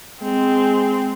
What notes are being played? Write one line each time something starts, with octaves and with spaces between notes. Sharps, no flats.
G#3 C4